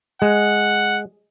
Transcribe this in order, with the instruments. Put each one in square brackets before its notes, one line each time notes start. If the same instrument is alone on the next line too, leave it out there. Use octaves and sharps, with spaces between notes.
[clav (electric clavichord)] G#3 [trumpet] F#5